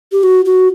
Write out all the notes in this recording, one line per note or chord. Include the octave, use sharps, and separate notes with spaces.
G4
F#4
F#4